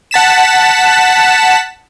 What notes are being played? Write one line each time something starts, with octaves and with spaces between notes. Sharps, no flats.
F#5 A5 B6 E7